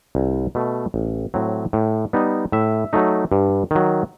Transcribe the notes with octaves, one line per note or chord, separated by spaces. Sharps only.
C2
B2 A3
A1
A2 F#3 C4
A2
G3 B3 D#4
A2 E5
F#3 A3 D#4
G2
D#3 F#3